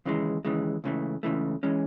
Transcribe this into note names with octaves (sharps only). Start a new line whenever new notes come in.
D#2 C#3 E3 G#3
D#2 C#3 E3 G#3
C#2 C#3 E3 A3
C#2 C#3 E3 A3
E3 G#3 C#4